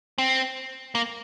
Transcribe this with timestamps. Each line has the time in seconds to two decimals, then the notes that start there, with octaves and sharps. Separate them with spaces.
0.18 C4
0.95 A#3